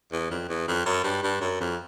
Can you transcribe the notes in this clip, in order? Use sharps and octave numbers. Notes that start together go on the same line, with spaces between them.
E2
F2
E2
F2
F#2
G2
G2
F#2
F2